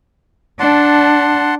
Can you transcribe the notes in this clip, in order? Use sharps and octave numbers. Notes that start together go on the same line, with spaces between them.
D4 F#5 A5 C6